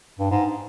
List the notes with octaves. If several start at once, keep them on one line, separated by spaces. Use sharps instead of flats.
G2
G#2